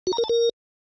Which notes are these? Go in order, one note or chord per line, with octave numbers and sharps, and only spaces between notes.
F#4
A#5
A#4
A5
A#4